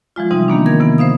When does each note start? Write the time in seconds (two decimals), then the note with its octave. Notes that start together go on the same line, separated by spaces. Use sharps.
0.16 E3 F3 G#3 F4
0.31 C3 E3 G3 C4 D#4
0.48 D#3 A#3 B3 D4
0.66 D#3 A#4 G#6
0.80 C3 E3 B3
0.98 C5 E5 F5 D#6